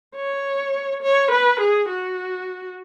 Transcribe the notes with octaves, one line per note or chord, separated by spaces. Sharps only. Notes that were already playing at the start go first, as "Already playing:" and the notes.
C#5
C#5
B4
G#4
F#4